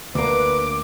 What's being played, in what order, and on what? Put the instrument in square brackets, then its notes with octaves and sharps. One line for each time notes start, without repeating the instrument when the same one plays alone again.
[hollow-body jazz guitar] D2 A#3 [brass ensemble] B4 [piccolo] D6